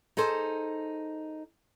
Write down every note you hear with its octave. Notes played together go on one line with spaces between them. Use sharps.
D#4 G#4 A4 C5